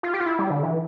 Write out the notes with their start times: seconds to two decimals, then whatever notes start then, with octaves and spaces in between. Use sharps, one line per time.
0.03 F4
0.14 G4
0.20 F4
0.26 E4
0.39 G3
0.50 D3
0.63 E3